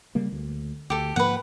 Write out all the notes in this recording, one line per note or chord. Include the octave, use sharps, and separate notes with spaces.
C#3 G3 A#3
D2
D2 G4 A4
G#2 F3 A#3 B4 F#5